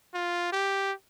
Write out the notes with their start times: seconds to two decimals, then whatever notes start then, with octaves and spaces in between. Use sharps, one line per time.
0.14 F4
0.52 G4